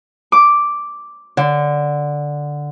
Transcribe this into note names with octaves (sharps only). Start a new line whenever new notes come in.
D6
D3